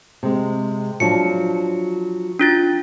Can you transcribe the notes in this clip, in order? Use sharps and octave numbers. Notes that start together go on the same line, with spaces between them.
C3 G#3
F3 F#3 D4 C#7
D4 F4 A6